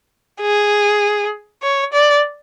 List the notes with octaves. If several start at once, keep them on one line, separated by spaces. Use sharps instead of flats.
G#4
C#5
D5